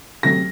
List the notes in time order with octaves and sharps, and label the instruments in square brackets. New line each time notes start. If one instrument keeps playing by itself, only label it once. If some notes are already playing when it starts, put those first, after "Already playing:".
[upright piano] C3 F#3 A3 A#6